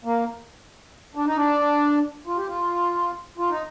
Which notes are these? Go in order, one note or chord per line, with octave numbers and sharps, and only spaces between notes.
A#3
D4
D#4
D4
F4
G4
F4
F4
D#4